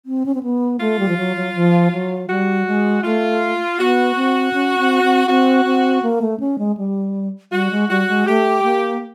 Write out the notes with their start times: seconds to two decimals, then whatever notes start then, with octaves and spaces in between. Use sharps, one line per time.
0.06 C4
0.26 C#4
0.35 C4
0.43 B3
0.80 A3 F4
0.99 G3
1.09 F3
1.17 F#3
1.37 F#3
1.55 F3
1.92 F#3
2.30 G3 F#4
2.66 G#3
3.04 A3 F4
3.79 B3 F#4
4.16 C4
4.53 C#4
4.78 C4
5.03 C4
5.28 C4 F#4
5.65 C4
6.03 A#3
6.22 A3
6.40 C#4
6.59 G#3
6.77 G3
7.52 G3 F#4
7.71 G#3
7.90 G3 F#4
8.08 G#3
8.27 A3 G4
8.64 A#3